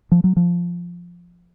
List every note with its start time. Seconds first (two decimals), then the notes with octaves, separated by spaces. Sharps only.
0.12 F3
0.24 F#3
0.37 F3